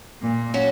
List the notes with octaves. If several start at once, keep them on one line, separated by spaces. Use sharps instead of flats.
A#2
F#3 C#4 F#4